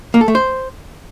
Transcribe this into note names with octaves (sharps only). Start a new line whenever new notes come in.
A#3
A4
A3
C5